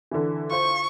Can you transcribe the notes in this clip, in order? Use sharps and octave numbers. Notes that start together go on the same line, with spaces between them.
D3 E3
F4 C5 C#6